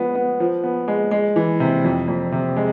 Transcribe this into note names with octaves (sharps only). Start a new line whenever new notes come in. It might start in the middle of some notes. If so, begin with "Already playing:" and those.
Already playing: F3 G#3 B3
B3
F3
B3
G#3
G#3
E3
C3
F2
F2
C3
G#3